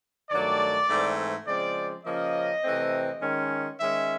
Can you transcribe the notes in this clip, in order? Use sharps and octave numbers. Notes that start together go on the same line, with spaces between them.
G2 D#3 F#3 A3 D5
G#2 E3 A3 C4
C#3 F3 G#3 C4 D5
C#3 F3 A#3 C#4 D#5
C3 E3 A3 C4
D#3 G#3 C#4
D#3 G#3 C#4 E5